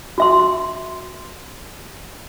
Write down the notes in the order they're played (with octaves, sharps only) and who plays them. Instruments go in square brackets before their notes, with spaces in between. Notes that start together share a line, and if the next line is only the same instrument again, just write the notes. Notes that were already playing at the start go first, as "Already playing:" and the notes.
[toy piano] F#4 E5 C6